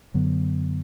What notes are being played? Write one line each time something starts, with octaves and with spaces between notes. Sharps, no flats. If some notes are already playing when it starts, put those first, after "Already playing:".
F#2 D3 F#3 B3